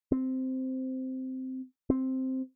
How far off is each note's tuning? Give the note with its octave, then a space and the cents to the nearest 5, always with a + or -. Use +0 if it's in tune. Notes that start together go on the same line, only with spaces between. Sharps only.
C4 -10
C4 +0